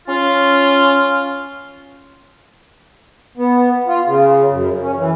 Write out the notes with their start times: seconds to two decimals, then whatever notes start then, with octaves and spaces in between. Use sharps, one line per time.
0.08 C#4 F4
3.37 B3
3.87 F4
4.06 C#3
4.50 F#2
4.81 C#4
4.96 E3